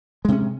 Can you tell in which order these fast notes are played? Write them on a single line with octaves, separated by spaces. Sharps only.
G#3 C3 C#4